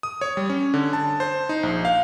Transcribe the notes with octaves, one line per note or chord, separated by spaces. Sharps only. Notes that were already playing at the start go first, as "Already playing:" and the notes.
D#6
C#5
G3
C#4
D3
A5
C5
D#4
A#1
F5